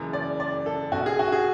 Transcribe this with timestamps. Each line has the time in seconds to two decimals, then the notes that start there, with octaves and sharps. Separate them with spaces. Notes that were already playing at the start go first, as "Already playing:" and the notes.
Already playing: F#1 F#2 C#3 E3
0.13 D5
0.40 D5
0.66 A4
0.92 B1 B2 F#4
1.06 G#4
1.19 F#4
1.32 G#4